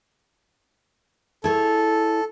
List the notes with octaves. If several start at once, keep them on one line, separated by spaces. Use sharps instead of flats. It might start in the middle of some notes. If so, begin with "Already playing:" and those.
E4 G#4 A4 C#5